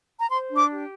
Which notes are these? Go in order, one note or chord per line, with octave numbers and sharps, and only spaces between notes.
A#5
C5 C6
D4
D6
G4